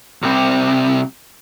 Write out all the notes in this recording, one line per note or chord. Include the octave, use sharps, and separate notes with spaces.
C2 C3